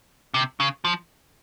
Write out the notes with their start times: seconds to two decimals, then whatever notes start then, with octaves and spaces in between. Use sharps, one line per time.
0.34 C3
0.60 C#3
0.85 F3